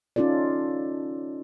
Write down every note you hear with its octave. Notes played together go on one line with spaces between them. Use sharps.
C#4 D#4 F4 A4 D5